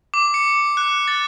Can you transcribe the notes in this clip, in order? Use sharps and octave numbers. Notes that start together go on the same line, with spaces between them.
D6
C#7
F#6
A6